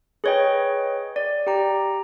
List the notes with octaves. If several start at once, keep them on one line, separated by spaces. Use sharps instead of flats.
G#4 B4 C#5 D#5 G5
D5
G4 G5 A#5